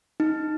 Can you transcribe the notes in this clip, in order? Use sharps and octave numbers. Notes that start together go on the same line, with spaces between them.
D#4